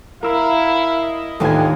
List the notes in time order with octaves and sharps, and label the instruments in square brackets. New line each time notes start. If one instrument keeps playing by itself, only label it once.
[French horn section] E4 [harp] A#4 E6 [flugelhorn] F5
[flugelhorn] D#5
[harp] D#2 G#5 [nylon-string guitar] A2 E3 C4 [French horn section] D4 D#4 F4